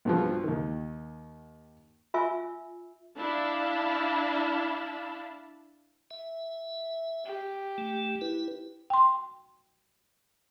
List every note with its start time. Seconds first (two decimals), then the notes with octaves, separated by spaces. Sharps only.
0.05 B1 G2 F3
0.44 D#2 D#3
2.14 F4 E5 G#5 E6
3.17 D4 E4 F5 A5 B5
6.11 E5
7.25 G4
7.78 A3
8.21 E4 B4
8.90 G5 C6